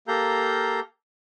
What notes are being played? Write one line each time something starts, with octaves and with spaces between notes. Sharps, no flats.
A#3 G4 A4 F5 A#5 G6